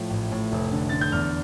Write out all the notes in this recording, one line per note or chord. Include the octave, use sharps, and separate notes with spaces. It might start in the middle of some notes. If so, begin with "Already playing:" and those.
Already playing: A2 F3
A1
A2
F1
D3
D3 A6
G6
E2 F6